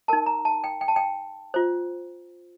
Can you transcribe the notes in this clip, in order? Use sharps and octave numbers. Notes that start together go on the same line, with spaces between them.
D#4 A#4 A5
A#5
A5
G5
G5
A5
G5
F4 C5